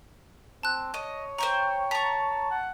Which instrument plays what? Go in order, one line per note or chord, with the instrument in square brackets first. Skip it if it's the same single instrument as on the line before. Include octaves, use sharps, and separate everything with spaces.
[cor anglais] C4 [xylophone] A5 F#6
[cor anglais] C#5 [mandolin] D#5
[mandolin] C5 G5 C#6 [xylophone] A#5
[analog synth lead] A5 [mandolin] A#5 C#6 [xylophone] B6
[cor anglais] F#5